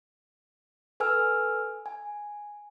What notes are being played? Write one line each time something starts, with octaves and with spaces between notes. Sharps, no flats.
A4 B4 G#5 E6 F6
G#5